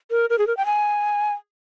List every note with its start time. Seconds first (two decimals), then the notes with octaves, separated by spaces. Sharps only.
0.11 A#4
0.30 A#4
0.38 G#4
0.47 A#4
0.57 G5
0.66 G#5